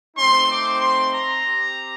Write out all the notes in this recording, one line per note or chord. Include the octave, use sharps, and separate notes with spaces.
A3 C4 D#4 C6
D6
C6
A#5
C4 G4